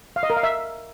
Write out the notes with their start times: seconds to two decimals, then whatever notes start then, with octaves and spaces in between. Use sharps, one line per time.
0.16 F5
0.23 D#5
0.30 A#4
0.37 F5
0.43 E5